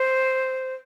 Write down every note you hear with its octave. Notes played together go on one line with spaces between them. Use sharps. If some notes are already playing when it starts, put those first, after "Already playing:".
Already playing: C5